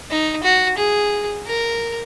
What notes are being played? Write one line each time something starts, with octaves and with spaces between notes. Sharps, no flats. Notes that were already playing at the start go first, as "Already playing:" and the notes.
D#4
F#4
G#4
A#4